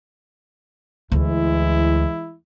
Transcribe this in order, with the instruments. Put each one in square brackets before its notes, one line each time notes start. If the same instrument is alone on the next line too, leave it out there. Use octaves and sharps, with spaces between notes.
[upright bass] D2 [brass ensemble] E3 G#3 E4